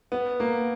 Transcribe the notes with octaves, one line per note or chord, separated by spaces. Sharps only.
B3
A#3